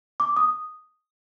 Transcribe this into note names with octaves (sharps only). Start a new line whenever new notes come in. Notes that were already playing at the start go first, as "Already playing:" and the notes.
D6
D#6